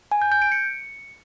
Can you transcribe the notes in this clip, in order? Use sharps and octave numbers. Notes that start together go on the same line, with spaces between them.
G#5
G6
G6
D7
C#7